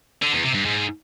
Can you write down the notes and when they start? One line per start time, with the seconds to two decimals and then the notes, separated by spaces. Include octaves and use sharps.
0.22 D3
0.33 E2
0.44 C3
0.54 G2
0.65 G#2